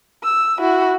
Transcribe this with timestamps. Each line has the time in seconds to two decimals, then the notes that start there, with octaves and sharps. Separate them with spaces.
0.23 E6
0.60 E4 F#4